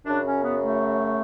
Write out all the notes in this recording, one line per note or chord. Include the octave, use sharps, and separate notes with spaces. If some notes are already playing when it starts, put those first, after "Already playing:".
F#2 C#3 F#3 D4
C#4
B3
A3